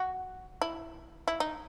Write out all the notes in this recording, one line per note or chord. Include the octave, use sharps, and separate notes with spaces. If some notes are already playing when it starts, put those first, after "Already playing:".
Already playing: F#4
E4
E4
D#4